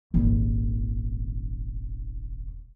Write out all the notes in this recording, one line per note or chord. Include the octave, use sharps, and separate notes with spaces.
D#1 G#1